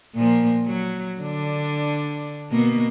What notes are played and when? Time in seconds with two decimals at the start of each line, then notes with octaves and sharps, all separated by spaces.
0.15 A#2 F3 A#3
0.66 F#3
1.21 D3 D4
2.51 B2 A#3